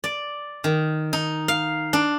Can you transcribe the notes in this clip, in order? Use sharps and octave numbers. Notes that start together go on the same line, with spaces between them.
D5
D#3
D#4
F5
D4